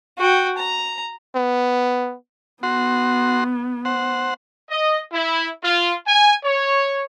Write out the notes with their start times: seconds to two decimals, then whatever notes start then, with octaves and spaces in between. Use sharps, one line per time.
0.18 F#4 G5
0.58 A#5
1.35 B3
2.63 B3 F#4 C6
3.85 C5 F#5
4.70 D#5
5.12 E4
5.64 F4
6.08 G#5
6.44 C#5